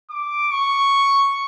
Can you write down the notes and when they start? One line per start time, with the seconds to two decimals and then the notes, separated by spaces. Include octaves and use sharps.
0.10 D6
0.52 C#6